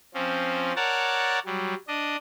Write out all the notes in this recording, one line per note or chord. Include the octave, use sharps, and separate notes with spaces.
F3 C4 C#4
A#4 C#5 D5 F#5 A5 A#5
F#3 G3
D4 D#5